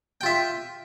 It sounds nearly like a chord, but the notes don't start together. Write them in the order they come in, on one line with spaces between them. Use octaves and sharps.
G5 F4 E5